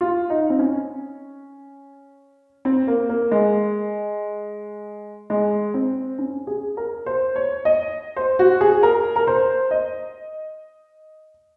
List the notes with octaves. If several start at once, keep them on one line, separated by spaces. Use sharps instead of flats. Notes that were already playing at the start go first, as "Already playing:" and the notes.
F4
D#4
C4
C#4
C4
A#3
A#3
G#3
G#3
C4
C#4
G#4
A#4
C5
C#5
D#5
C5
F#4
G#4
A#4
A#4
C5
D#5